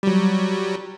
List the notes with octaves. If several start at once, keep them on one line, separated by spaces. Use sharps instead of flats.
F#3 G3